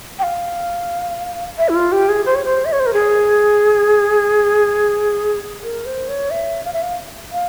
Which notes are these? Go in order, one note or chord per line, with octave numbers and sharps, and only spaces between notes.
G5
F5
E5
E4
F4
G4
G#4
C5
C#5
C5
E5
C#5
C5
A#4
G#4
A#4
C5
C#5
E5
F5
E5
F5
F5